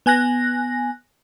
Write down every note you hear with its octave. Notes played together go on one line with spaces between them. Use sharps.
B3 G#5 F#6 A#6